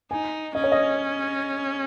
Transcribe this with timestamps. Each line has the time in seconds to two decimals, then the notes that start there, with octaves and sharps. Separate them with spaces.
0.11 D#4 G#5
0.55 C#4 D#5
0.64 C#5
0.72 D#5